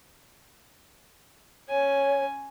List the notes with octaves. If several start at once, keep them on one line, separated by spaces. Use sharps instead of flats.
C#4 C#5 G#5